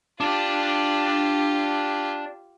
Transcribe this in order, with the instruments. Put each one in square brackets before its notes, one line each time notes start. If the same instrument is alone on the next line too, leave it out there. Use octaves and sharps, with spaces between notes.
[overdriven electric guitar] D4 D5 [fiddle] F4 G4